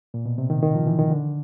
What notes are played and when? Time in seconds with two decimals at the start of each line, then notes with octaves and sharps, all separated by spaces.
0.14 A#2
0.25 B2
0.38 C3
0.50 D#3
0.63 D#3
0.75 F3
0.87 E3
0.99 D#3
1.11 D3